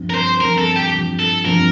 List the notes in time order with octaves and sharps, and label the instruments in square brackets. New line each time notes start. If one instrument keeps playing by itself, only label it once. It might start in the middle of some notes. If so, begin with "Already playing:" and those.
Already playing: [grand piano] G2 F3 C4
[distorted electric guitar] A#4
C5
[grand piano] G2 F3 C4 [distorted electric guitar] A#4
[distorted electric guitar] A4
G4
[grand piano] G2 F3 C4
[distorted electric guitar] A4
[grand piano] G2 F3 C4 [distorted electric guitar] A#4